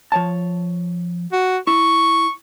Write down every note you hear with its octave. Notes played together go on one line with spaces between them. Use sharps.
F3 C#5 A5
F#4
E4 C#6